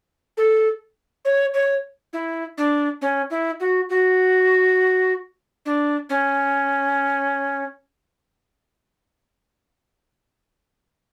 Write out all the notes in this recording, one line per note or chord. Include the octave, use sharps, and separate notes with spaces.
A4
C#5
C#5
E4
D4
C#4
E4
F#4
F#4
D4
C#4